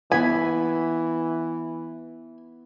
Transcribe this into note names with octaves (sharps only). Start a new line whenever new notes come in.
E3 B3 E4 G#5 B5